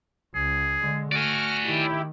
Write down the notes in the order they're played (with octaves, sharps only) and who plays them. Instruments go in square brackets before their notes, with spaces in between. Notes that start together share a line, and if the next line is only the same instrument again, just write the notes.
[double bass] C#2 [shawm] G#4
[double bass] D3 G#3
[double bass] A3 [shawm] F#4 [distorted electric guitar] D5 G#5 [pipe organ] F6
[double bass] D#3 [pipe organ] E4 G4